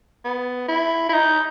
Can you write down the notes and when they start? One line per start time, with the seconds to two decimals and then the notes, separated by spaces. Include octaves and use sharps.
0.25 B3
0.69 E4
1.09 E4
1.13 D#4